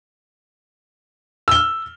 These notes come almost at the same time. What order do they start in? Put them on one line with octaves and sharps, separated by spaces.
E6 G7 F6